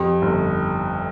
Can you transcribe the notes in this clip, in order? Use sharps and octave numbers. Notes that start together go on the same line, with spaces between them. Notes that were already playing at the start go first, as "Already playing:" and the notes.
Already playing: F2 G4
G1